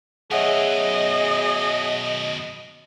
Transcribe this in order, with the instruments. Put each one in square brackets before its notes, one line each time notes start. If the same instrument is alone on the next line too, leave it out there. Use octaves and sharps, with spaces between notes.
[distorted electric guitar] F#2 B2 [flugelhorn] G#4 [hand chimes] C#5 E5 F#5 [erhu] D#5